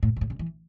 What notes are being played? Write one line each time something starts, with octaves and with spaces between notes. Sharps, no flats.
A2
B2
A2
C3
E3